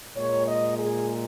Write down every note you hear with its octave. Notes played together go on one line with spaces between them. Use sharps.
A#2 G#3 C#5
D#5
G#4